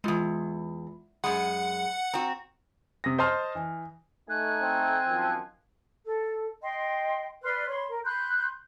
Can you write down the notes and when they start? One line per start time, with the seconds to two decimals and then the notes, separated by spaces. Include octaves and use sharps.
0.04 E2 G#2 G#3 F4
1.24 F#2 G#3 F#5 B5 C6
2.14 C4 F#4 A#5
3.04 C3 D#6 A#6
3.18 C5 D#5 A5 C6 F6
3.55 E3
4.30 A3 D#4 G#5 F#6
4.63 C4
5.08 F#2 D#3 F3
6.04 A4
6.63 D#5 G5 C6
7.43 B4 D5 C6 F6
7.68 C#5 B5 C6
7.88 A#4
8.04 B5 C6 F#6 G6